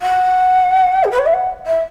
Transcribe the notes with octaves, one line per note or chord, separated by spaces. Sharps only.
F#5
G#4
B4
C#5
E5
F#5
E5